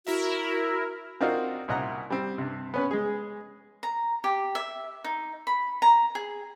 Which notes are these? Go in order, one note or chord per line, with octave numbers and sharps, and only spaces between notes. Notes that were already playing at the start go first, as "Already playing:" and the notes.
E4 F#4 A#4 E5
C4 D4 D#4 F4 F#4 A#4
C2 A#2 D#5 F#5 A#5
G3 C4
G2 C3
B3 C#4 B4
G#3 G#4
A#5
G4
E5
D#4
B5
A#5
G#4